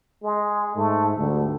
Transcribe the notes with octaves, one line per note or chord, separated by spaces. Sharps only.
G#3
G#2 A3
D2 G2